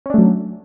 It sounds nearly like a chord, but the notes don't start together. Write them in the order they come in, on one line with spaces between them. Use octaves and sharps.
C#4 D4 A3 F#3